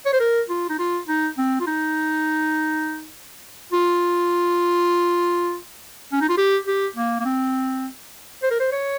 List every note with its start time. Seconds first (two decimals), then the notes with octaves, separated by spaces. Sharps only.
0.06 C#5
0.13 C5
0.20 A#4
0.49 F4
0.70 D#4
0.79 F4
1.08 D#4
1.38 C4
1.60 F4
1.67 D#4
3.73 F4
6.12 C#4
6.21 D#4
6.29 F4
6.38 G4
6.67 G4
6.96 A#3
7.20 A#3
7.26 C4
8.43 C5
8.51 A#4
8.60 C5
8.72 C#5